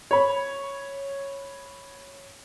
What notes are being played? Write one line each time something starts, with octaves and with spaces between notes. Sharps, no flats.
C#5 B5